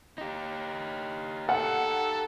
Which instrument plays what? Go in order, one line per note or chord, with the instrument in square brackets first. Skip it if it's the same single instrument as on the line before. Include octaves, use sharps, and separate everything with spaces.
[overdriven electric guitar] D#4 G4
[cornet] A4 [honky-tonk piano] F#5